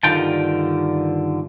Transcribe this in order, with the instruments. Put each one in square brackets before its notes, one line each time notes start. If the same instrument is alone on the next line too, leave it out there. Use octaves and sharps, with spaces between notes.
[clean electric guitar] G2 D3 D#3 F4 G5 A5